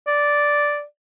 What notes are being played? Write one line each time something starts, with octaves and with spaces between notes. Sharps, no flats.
D5